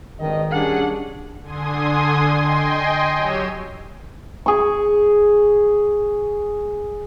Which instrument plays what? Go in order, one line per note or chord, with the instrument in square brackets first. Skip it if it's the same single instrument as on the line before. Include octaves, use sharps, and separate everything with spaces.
[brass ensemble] G#1 G2 D#5 [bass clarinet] D#3
[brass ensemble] G3 C#4 G#4 [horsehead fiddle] D4 F#5
[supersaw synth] D3 G#5 C6 D#6
D#5 G5 G#5 C6
F#3 G4 C#5 E6 D#7
[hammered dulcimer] G#4 C#6